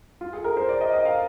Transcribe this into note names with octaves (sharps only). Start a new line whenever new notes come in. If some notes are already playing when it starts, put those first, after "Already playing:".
F4
G#4
A#4
C5
D5
D#5
D#5
F5